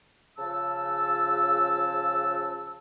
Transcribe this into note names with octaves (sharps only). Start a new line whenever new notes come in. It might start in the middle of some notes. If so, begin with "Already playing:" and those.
C#3 F3 A5 E6